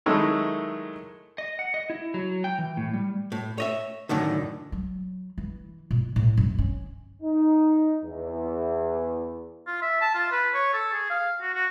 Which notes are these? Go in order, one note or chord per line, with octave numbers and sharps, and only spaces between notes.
D#3 F#3 G#3 A3 E4
D#5
F#5
D#5
E4
F#3
G5
E3
A2
G3
A2
C#5 D#5 E5
F#2 A2 D3 D#3
F#3
E3
A#2
A2
F#2
C#4
D#4
E2
F4
E5
A5
F4
B4
C#5
A4
G#4
F5
F#4
F#4